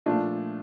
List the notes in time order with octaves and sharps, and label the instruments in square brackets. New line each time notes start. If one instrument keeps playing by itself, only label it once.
[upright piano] A#2 F3 A3 D4 F4